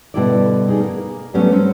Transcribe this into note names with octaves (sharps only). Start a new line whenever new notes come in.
B2 D3 G3 E4 A4 D5
D#4 G#4 A4
A#3
F#3 G3 A3 B3 C#4
C4 C#4